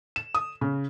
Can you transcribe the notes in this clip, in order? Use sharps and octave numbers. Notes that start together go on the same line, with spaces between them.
E7
D#6
C#3